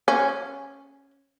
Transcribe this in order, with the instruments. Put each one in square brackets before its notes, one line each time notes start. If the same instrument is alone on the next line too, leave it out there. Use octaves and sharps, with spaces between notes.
[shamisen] C#4